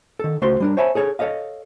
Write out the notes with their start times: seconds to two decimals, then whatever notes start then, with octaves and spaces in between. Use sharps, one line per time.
0.19 D#3 A4
0.42 C#2 A3 F#4 C5 C6
0.60 G3 D4 A#4
0.77 C5 C#5 E5 G#5 A5 B5
0.95 G#4 A4 C#5
1.19 A4 C#5 D#5 F5